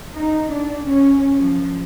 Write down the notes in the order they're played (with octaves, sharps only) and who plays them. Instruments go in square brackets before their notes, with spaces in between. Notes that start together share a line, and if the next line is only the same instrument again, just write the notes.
[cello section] D#4
D4
C#4
F3